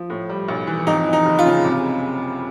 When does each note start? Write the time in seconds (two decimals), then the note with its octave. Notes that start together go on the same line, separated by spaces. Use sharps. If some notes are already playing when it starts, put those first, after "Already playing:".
Already playing: F3
0.10 A2
0.29 G3
0.48 B1
0.67 E3
0.87 F2 D#4
1.07 E3
1.13 D#4
1.26 F#1
1.39 F4
1.45 C#3
1.64 C3